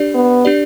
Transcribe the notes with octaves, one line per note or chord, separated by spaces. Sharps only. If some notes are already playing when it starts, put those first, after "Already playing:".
Already playing: D4 G4 D5
B3
D4 G4 D5